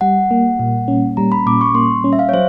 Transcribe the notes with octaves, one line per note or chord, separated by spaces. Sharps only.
G3 F#5
A#3
A#2
C#4
G3 A#5
B5
A#2 D6
C#6
A#3 C6
C#4
E5
F5
C#5
F#3 C5